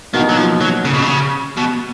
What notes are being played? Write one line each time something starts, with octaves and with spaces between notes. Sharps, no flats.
B2 D#3 A#3 D#4 F#4
F#3
F3
F#3
C#3
B2
C#3
B2